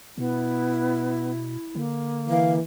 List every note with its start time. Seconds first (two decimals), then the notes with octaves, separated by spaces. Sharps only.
0.18 B2 B3 E4
1.75 D3 A#3
2.29 E3 F5